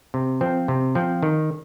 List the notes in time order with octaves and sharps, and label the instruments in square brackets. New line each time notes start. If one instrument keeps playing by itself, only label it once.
[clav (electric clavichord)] C3
F3 C4
C3
F3 C4
D#3